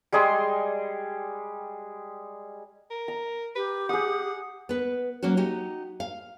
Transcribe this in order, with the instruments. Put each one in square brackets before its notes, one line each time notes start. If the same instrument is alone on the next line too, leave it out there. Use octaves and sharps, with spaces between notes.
[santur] G3 G#3 G#4 C6
[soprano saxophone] A#4
[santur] A#5
[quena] G4 [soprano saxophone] B4
[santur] G#4 D#6 [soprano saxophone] F#5
[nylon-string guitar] B3 B4
F#3 A#3 C#4 F#4
D#4 F#4 G4
F5